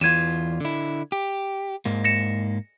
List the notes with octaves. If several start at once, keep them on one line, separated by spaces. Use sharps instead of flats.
E2 E3 F4 G#6 D#7 E7
D3 E4
G4
G#2 A#3
A#6 C#7 E7